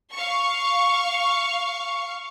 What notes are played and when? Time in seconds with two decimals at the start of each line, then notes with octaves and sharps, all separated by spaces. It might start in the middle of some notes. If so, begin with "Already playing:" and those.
0.12 F5 C#6